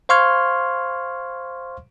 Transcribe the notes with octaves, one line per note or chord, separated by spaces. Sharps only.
C5 F5 C6 C#6 F6 G#6